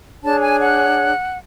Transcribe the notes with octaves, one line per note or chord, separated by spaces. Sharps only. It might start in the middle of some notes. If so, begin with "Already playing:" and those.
D4 G#4 C#5 A5
G#5
F#5